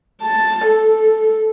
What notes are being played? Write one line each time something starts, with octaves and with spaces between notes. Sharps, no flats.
A5
A4